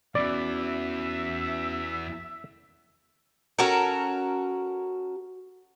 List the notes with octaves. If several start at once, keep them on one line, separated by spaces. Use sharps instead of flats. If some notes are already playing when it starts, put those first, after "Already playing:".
E2 E3 B3 C#4 F#4 D5 E5
C#4 F#4 A4 A#4